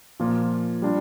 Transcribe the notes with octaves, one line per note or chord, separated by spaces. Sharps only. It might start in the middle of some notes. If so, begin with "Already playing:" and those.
A#2 F3 A#3 F4
G3 D4 F4